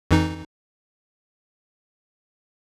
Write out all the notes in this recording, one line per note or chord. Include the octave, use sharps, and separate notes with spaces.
F2 E3 D#4